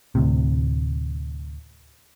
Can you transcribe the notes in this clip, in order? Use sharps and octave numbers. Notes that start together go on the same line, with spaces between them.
D2 A2 C3